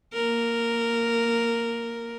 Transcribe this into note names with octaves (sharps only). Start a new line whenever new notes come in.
A#3 A#4